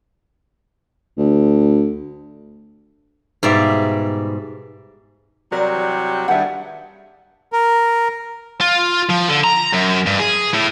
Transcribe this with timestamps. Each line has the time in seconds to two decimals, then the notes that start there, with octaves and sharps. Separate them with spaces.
1.18 D2
3.43 G#2 B2 G3 D5 E5 F5
5.52 C3 F#3 G3 A#4 D5
5.75 E3
6.28 G2 D#3 G#3 A3 E5 F#5
7.52 A#4
8.61 F4
9.10 F3
9.29 D3
9.44 A#5
9.73 F#2
10.06 G2
10.19 G#4
10.54 A2